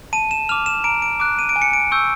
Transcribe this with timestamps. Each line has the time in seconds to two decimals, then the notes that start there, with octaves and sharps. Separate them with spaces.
0.13 A5 D#7
0.31 E7
0.49 D6 F6 F7
0.66 E7
0.84 A#5 D7
1.02 D7
1.20 D6 F#6 D7
1.39 D#7
1.49 D7
1.56 G#5
1.62 C#7
1.73 D7
1.92 C#6 E6 G6